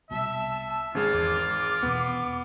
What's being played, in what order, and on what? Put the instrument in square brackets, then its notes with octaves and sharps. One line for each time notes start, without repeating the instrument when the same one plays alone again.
[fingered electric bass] C2 B2 [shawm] E5 [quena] A5
[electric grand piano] G#1 G#4 [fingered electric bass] G#3 C#4 [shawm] F4
[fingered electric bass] E2 [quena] D6
[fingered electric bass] E2 B2 [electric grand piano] B3